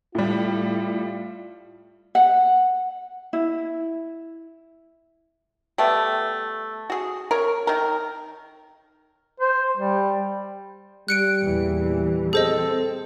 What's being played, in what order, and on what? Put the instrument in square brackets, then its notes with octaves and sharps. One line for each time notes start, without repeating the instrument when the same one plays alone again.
[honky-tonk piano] A2 G3 [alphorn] F4
[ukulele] F#5
E4
[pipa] G3 A3 B3
F#4 G#4
A#4 C#5
D#3 A#4
[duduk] C5
G3
[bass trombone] G3 [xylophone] F#6 C#7 D7
[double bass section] E2 A#2 E3
[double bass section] C4 [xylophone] G#4 C5 D#5 [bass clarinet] A4